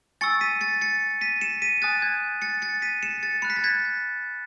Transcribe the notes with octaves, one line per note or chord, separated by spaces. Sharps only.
G#5 C#6 E6 A6 C#7
B6 D#7
A6 C#7
A6 C#7
B6 D#7
C#7 E7
B6 D#7
G#5 D#6 F#6 A6
G#6
A6 C#7
A6 C#7
B6 D#7
C#7 E7
A6 C#7
B5 F#6 C#7
B6
A6
G#6 B6